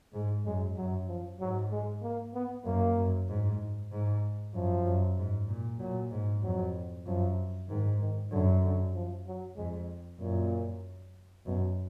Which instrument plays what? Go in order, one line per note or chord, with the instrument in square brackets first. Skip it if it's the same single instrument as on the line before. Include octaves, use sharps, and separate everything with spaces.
[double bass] G#2 [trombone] G#3
[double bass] F#2 [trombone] G#3
[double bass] F#2 [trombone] F#3
[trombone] F3
[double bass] G#2 [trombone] F#3
[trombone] G#3
A#3
B3
[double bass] F#2 [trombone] A#3
[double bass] F#2
G#2
G#2
[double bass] F#2 [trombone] F3
[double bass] F#2
G#2
A#2
[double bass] A#2 [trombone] F#3
[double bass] G#2
[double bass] F2 [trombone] F#3
[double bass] F#2 [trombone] F3
[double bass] G#2 [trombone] D#3
[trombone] D#3
[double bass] F#2 [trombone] D3
[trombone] D3
F3
F#3
[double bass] F2 [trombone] G#3
[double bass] F#2 [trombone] A#2
[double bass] F#2 [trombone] B2